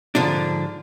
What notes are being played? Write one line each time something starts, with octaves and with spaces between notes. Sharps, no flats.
G#2 D3 F3 D4